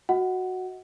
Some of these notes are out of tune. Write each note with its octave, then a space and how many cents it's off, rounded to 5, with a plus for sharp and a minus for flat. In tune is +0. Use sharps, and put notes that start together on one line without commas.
F#4 -5 D#5 +40 F#5 +10